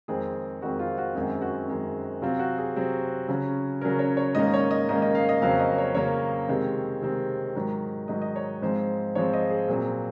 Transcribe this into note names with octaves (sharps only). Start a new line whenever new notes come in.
F2 D#3 G#3 C4 G#4
F2 D#3 G#3 C4 F#4
F4
F#4
F#2 D#3 G#3 C4
F#4
F#2 D#3 G#3 C4
C3 F#3 C4 F4
F#4
G#4
C3 F#3 C4
C#3 F#3 C#4
C#3 F#3 C#4 A#4
C#5
C#5
G#2 D#3 A#3 C#4 D#5
C#5
D#5
G#2 D#3 A#3 C#4 D#5
D#5
F5
D#5
F2 C#3 F#3 A#3 C#4 F5
D#5
C#5
F2 C#3 F#3 A#3 C#4 C#5
C3 D#3 G#3 C4
C3 D#3 G#3 C4
G#2 D#3 F#3
G#2 D#3 F#3 D#5
D#5
C#5
G#2 F3 G#3 C4 C5
G#2 F3 G#3 C4 C#5
D#5
G#4
A#2 F#3 C4